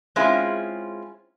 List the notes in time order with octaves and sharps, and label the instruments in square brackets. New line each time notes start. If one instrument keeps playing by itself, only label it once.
[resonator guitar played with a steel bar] G#3 C4 C#4 E4 F4 G#4